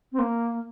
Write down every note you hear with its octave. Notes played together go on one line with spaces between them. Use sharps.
C4
A#3